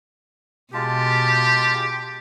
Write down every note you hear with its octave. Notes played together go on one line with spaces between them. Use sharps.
B2 G#3 F4 G4 A5